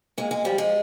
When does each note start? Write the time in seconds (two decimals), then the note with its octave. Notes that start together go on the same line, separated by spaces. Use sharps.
0.18 A#2 G#3
0.31 G#3
0.45 F3 G3
0.58 G#3